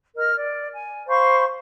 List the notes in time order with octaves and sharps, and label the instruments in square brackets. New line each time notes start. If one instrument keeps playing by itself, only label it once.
[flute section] A#4 D#5 F6
D5
G#5
C5 F5 B5 C#6